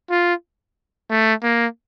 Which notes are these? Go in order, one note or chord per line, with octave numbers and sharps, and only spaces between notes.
F4
A3
A#3